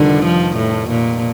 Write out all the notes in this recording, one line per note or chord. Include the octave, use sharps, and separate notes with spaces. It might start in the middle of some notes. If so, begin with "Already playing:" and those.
Already playing: F1 F2 D3 D#3 G3
F3
A2
A#2